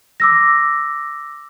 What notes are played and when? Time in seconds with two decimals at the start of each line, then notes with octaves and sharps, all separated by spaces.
0.20 D6 E6 A#6